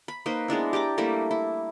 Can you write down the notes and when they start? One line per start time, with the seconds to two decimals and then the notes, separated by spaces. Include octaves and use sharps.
0.08 B5
0.26 A#3 D#4 B4 C5
0.48 G#3 B3 D4 E4
0.73 G4 D5 A#5 D6
0.98 G3 A3 A#3 E4
1.31 E4